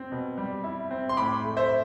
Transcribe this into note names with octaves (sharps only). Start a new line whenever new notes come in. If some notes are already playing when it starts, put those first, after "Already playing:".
Already playing: C4
B2
G3
E4
C4
C6
A2 B5 D6
A3
C5 E5